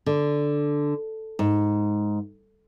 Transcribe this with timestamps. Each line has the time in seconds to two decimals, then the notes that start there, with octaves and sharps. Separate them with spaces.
0.06 D3
1.39 G#2